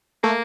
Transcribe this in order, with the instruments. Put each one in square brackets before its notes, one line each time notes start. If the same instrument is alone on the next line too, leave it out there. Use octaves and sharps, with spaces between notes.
[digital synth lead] A3 [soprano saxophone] A#3